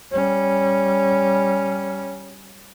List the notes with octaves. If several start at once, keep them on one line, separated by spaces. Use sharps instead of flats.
G3 C#4